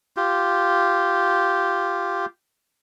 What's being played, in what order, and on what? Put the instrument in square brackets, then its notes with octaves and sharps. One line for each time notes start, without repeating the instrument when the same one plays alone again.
[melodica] F4 G4